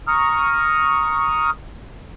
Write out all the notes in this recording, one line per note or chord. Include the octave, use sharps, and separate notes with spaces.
A#5 C#6 D#6 F6